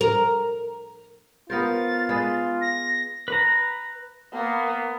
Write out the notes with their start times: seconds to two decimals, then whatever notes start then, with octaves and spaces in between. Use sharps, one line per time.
0.01 A#4
1.50 B3 F4 A#4 C5 A6
2.09 G#3 G#4 B4
2.61 A#6
3.28 B4 A#5
4.33 A#3 B3